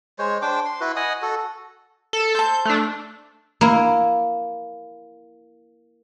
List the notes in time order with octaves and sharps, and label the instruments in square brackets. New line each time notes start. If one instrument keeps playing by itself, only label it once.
[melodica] G#3 C5 C#5
D4 C5 G5 D6
C6
E4 F#4 B4
D#5 F#5 G#5 D#6
F#4 A4
[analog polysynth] A4
[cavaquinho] C5 A5 [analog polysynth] G6
[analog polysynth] A3 D4
[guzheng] A#3 E4